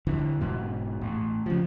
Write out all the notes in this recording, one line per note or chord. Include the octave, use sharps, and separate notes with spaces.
E2 D3 E3
E1 G#2 B2
A1
C#3 F3